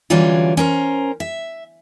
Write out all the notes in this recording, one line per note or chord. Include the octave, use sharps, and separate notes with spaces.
D3 E3 F#3 G3 C#4 F4
C#4 A#4 C5
E5